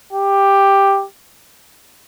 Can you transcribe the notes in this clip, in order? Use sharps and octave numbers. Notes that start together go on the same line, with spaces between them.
G4